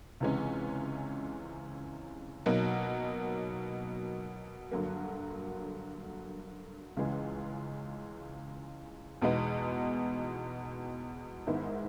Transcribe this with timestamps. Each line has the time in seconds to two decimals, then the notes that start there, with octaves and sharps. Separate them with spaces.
0.20 C#2 C3 E3 G#3 C#4
2.46 B2 F#3 A#3 D#4
4.71 G2 D3 F#3 A#3
6.97 C#2 C#3 E3 G#3
9.22 E2 B2 G#3 B3 D#4
11.47 G#2 D#3 G#3 B3 E4